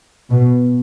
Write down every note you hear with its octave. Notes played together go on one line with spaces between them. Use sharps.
B2